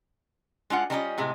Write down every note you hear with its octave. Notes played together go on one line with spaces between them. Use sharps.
G#3 D4 F4 F#5
D#3 G3 C#4 D4 F4 D#5
A2 C3 G#3